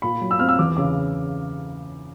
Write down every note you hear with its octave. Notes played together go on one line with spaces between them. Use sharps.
A#2 B5
F#3
E6
C4 F6
E6
E2 D6
C#3 D6